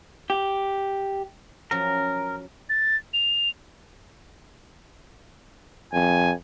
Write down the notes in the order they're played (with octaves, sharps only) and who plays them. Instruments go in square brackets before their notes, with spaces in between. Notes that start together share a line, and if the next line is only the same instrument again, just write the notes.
[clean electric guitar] G4
[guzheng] F3 F#3 C#4 [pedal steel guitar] A#4
[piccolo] A6
F7
[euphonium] F2 [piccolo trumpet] G#5